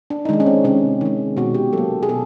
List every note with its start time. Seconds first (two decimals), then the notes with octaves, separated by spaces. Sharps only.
0.10 D4
0.25 D#4
0.29 D#3 G#3 D4
0.40 C#4
0.46 C4
0.64 C3 C#4
1.01 D#3 G#3
1.37 B2 F#4
1.54 G4
1.73 F#3 A#3 A4
2.03 G#4
2.09 B2 A4